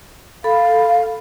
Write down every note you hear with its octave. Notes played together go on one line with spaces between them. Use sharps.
A4 F5 B5